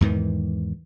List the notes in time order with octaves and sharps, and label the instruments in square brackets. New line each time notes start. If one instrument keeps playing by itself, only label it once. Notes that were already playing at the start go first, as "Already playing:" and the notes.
[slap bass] E2 G#2 D#3 E3